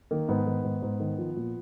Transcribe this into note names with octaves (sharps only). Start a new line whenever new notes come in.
D#3 A#3
G#2 B3
D#3
G#2
G#2
D#3
F3
A#2